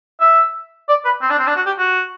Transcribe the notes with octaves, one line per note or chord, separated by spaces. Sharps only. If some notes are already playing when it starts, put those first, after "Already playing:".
E5
D5
B4
C4
D4
C4
D4
F#4
G4
F#4